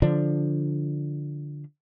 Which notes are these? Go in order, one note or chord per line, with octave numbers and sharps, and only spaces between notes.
D3 F3 D4